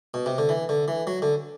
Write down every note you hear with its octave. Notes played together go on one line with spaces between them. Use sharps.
B2
C3
D3
E3
D3
E3
F#3
D3